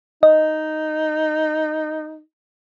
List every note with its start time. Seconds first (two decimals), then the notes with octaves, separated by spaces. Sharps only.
0.23 D#4 D#5